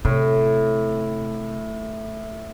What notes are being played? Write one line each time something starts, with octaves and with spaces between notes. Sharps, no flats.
A2 C3